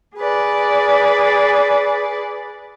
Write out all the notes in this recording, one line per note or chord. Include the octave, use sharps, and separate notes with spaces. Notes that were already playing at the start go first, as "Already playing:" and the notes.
G#4 B4 D5